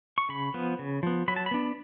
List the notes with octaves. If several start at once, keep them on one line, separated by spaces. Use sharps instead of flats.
C#6
C#3 B5
F3 B3
C#3
F3 B3
F#3 B5
A5
B5
B3 D4